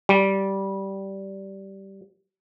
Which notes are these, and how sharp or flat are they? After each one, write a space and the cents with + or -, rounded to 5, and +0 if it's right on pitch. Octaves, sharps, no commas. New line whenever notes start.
G3 -10